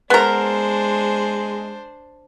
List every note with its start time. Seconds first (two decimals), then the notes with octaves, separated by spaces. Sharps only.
0.10 G#3 B3 D4 A#4 C5